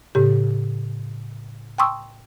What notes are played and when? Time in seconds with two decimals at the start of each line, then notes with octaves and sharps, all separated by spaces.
0.15 A2 C#3 G4
1.78 G5 A5 C6 C#6 D#6 E6